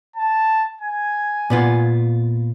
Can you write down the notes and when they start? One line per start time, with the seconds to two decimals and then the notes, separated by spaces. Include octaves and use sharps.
0.16 A5
0.81 G#5
1.50 A#2 B3 F4